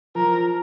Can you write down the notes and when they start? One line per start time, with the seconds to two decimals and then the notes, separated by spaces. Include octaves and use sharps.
0.15 F3 A#4